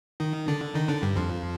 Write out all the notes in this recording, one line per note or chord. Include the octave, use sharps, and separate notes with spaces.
D#3 D#4
D3 D4
D#3 D#4
D3 D4
G2 G3
F2 F3